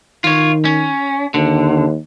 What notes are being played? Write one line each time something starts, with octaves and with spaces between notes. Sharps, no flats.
D#3 F4 C#5
C#4
D#2 D3